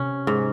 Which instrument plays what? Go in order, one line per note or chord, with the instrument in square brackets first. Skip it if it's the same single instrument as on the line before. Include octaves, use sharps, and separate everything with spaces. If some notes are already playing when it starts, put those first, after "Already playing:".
Already playing: [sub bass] C3 [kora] C#4
[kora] G#2